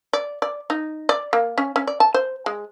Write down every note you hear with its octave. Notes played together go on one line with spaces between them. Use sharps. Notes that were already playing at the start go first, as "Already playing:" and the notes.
D5
D5
D#4
D5
A#3
C#4
C#4
D5
A5
C5
G#3